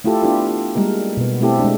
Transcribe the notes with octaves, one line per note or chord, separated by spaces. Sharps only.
A3 E4 F4 G4 A4
B3 D4 E4 F4 G4 A4
G3 G#3 A#3 A#4
B2 B3
A3 C4 E4 G4 A4
G#3 D4